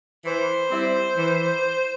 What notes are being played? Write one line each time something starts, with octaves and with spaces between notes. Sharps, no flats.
E3 C5
G3 C4 E4
E3